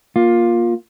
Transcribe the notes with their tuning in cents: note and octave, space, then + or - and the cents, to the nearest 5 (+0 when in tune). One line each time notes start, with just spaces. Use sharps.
A#3 +15 F4 +10